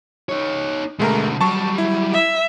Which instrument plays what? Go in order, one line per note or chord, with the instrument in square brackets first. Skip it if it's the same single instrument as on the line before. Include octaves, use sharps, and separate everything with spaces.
[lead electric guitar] D#4 C#5
[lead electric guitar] B2 D3 [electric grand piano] G#3 A3 A#4
[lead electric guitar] F#3 G3 [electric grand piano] A5 C#6
[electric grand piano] E4
[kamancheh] E5